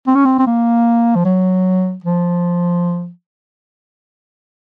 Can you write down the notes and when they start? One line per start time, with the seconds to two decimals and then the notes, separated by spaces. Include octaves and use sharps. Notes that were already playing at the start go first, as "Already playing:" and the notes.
0.07 C4
0.15 C#4
0.25 C4
0.39 C4
0.47 A#3
1.15 F3
1.25 F#3
2.04 F3